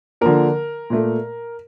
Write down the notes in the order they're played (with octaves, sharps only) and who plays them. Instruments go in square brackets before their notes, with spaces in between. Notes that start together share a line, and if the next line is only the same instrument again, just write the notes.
[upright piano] D3 F3 A#3 A#4
A#2 A3